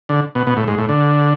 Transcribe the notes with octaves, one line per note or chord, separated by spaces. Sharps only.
D3
B2
B2
A2
G#2
A2
D3